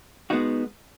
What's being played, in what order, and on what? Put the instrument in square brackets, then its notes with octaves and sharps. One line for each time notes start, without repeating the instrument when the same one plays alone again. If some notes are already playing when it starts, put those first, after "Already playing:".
[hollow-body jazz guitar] G#3 B3 D#4 F#4